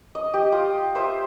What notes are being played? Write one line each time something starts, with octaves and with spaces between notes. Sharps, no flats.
D#5
G4 D#5
F4 D#6
C5 E5 D#6